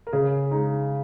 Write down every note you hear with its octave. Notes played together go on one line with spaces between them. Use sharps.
A#4
C#3 G#4
G#3 D#4